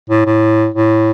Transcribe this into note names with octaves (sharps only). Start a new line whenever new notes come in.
A2
A2
A2